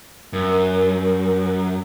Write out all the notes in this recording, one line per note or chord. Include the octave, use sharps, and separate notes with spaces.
F#2 A#4